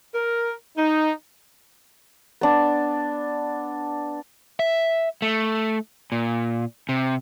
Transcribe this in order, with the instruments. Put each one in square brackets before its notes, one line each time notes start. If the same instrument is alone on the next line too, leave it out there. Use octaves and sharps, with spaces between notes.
[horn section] A#4
D#4
[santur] B3 D4
[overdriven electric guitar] E5
A3
A#2
C3